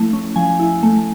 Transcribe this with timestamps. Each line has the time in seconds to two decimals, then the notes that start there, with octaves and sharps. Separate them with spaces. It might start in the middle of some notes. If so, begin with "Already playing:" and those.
Already playing: F3 A3 E4
0.13 C#4
0.36 F3 G#5
0.59 E4
0.83 A3